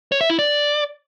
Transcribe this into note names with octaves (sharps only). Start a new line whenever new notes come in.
C#5
E5
E4
D5